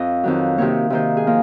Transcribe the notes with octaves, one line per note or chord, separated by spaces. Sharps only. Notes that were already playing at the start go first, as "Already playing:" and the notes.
Already playing: F2 D#5
F2 D#3 F#3
C3 D#3 A#3 C#5
C3 D#3 A#3 C5
G#4
F3 A#3